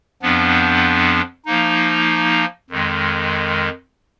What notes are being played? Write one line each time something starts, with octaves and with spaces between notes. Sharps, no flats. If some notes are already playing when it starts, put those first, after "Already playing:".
F2 F3 B3 D4
F3 A#3 D#4
F2 D#3 G#3